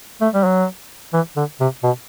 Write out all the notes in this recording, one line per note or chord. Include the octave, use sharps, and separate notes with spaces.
A3
G3
F#3
E3
D3
C3
B2